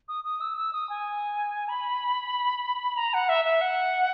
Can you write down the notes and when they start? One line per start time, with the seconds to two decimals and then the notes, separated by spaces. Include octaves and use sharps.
0.08 D#6
0.24 D#6
0.41 E6
0.57 E6
0.73 D#6
0.89 G#5
1.69 B5
2.97 A#5
3.14 F#5
3.29 E5
3.45 E5
3.61 F#5